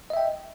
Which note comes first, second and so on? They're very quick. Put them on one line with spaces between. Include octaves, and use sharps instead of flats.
D#5 E5 G5